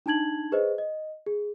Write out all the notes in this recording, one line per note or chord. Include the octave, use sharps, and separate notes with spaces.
D4 D#4 A5 G#6 F#7
G#4 B4 C5 D#5
D#5
G#4